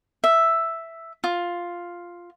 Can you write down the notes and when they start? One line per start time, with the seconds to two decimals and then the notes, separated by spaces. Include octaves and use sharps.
0.24 E5
1.24 F4